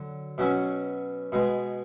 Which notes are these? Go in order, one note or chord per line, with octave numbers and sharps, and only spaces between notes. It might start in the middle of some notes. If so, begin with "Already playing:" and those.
Already playing: D3 F#3
B2 F#3 C#4
B2 G#3